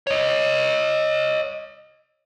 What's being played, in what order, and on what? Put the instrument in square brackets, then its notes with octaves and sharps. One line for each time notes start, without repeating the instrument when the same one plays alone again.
[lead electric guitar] C#5 D#5